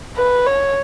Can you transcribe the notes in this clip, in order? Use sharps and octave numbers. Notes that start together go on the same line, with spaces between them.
B4
C#5